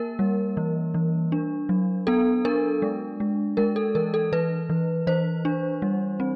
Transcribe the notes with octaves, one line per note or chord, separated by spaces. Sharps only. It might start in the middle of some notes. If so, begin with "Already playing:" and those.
Already playing: A#3 A#4
G3
E3
E3
D4
F#3
B3 A4
D4 A#4
G#3
G#3
G#3 A#4
A4
E3 A#4
A4
E3 B4
E3
E3 C5
D4
G3
C4